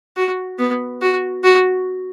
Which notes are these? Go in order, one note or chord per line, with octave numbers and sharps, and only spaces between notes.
F#4
B3
F#4
F#4